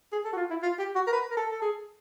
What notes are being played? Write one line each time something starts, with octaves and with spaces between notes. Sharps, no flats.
G#4
A4
F#4
F4
E4
F4
G4
F#4
A#4
B4
A#4
A4
A4
G#4